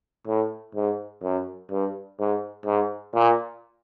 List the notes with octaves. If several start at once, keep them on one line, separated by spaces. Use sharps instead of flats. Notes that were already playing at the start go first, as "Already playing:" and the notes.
A2
G#2
F#2
G2
G#2
G#2
A#2